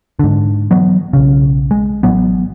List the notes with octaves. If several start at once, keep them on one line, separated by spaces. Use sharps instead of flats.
G#2 D3
E3 F#3 B3
B1 C#3
G#3
A1 A2 F#3 B3